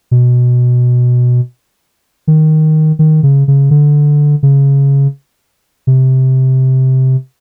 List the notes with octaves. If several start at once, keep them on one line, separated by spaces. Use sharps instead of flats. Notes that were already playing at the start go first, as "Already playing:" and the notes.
B2
D#3
D#3
C#3
C#3
D3
C#3
C3